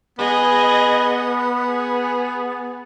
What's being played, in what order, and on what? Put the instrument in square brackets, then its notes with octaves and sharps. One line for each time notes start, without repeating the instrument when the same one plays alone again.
[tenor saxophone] B3 [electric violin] G#4 D#5
[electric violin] G#4